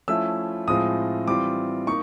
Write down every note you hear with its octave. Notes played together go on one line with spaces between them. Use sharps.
F3 A3 C#4 E4 E6
A2 F3 G#3 C4 F4 D#6
E3 G3 C4 F4 D6
A#3 D#4 C#6